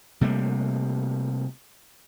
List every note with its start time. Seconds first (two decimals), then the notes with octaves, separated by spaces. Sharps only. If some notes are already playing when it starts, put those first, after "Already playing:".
0.21 C3 G3 A3 A#3